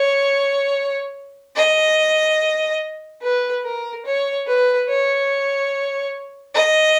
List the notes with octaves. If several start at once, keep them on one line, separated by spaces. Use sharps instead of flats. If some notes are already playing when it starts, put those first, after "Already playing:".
Already playing: C#5
D#5
B4
A#4
C#5
B4
C#5
D#5